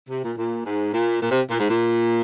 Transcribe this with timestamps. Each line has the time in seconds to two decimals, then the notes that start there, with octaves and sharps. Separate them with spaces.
0.09 C3
0.23 A#2
0.37 A#2
0.66 G#2
0.94 A#2
1.22 A#2
1.31 C3
1.51 A#2
1.60 G#2
1.70 A#2